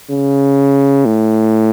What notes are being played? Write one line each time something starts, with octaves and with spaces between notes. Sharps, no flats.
C#3
A2